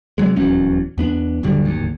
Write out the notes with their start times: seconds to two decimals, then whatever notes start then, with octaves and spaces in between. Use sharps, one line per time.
0.18 C3 F#3 G#3
0.36 D#1 E2 F#3 C#4
0.98 E2 B3 D4
1.43 D#1 F#2 D3 G3
1.65 D1 G#1 D#2